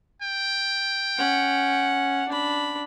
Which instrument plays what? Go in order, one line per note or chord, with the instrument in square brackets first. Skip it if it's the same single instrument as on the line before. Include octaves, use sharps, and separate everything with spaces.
[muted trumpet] G5
[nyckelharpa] C#4 F#5
D4 B5